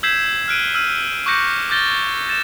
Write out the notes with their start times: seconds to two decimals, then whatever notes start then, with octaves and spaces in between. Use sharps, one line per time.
0.03 E6 G6 G#6 B6 C7 E7
0.48 F6 F#6 D7 D#7
0.75 E6 F6 D#7 F#7
1.26 C#6 D6 F#6 G6 A#6 C#7
1.70 D6 F6 G6 A6 A#6 G7
2.29 A6 E7